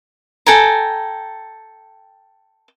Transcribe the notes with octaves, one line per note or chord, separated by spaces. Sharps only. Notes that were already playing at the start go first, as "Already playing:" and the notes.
A4 G5 G#5 A#5